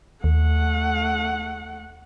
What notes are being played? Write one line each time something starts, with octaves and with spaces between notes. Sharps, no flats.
D#2 A3 F#5